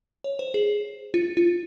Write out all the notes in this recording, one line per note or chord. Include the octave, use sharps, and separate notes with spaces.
C#5
C5
G#4
F4
F4